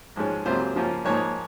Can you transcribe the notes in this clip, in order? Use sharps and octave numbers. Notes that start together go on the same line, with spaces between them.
G#2 F3 G#3 C#4
C#2 C3 F#3 A#3 F4 C5
C#3 F3 A#3 C#4 F4
G#2 F3 A#3 D#4 C#5